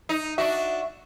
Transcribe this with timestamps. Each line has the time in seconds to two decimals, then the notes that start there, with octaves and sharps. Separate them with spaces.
0.09 D#4
0.38 D4 F#4 E5